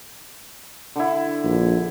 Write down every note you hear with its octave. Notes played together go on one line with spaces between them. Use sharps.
D3 E4
A#1